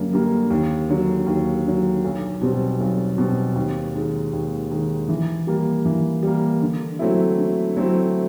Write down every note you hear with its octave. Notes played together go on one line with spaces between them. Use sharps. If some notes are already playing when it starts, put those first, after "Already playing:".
Already playing: F#2 D3 G3 A#3
D3 G3 A#3
D#2
D3 F#3
D#2
D3 F#3
B1
B2 G3 C4
B1
B2 G3 C4
D#2
D#3 G#3
D#2
D#3 G#3
E3
G3 A#3
E3
G3 A#3
D3
F#3 A3 C4 E4
D3
F#3 A3 C4 E4